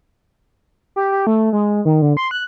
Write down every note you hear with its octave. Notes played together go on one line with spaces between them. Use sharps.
G4
G4
A3
G#3
D#3
D3
C6
F#6